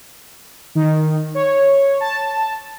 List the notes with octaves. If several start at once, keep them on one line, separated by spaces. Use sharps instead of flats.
D#3
C#5
A5